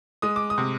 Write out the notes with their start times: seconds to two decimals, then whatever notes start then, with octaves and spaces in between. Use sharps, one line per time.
0.22 G#3 D#6
0.36 D6
0.50 D#6
0.58 C3